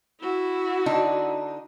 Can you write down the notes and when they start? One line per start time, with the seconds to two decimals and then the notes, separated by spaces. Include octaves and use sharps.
0.21 E4 F#4
0.86 D3 D4 D#4